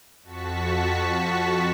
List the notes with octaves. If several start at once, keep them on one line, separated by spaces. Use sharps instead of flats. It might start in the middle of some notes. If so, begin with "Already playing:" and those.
F2 F#4 A5 C#6 B6